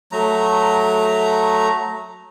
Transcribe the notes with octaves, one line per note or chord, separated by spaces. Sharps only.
F#3 A3 A#5